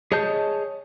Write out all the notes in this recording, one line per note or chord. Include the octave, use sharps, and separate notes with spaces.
G#4 C#5 D#5 A5 G6